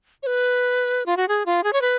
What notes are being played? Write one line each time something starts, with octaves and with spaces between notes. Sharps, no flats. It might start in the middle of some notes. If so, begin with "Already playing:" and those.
C#5
B4
F4
F#4
G#4
F4
G#4
C#5
B4